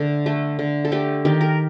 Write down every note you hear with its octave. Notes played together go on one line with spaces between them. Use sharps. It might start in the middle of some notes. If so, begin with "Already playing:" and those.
Already playing: D3 A3 A4
A3
D3
A4
A3 G4
D#3 G4
A#4